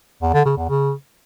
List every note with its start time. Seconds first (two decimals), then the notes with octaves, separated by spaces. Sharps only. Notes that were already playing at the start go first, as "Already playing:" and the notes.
0.22 E2
0.34 D3
0.45 C#3
0.57 E2
0.69 C#3